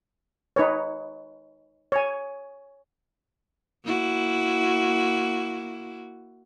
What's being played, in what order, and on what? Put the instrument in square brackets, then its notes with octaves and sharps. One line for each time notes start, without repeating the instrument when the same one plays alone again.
[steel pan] D#4 B4 C#5
C#5 G#5
[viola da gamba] A#3 E4 F#4